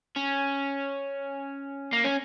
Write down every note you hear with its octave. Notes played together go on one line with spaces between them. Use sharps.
C#4
A#3
C#4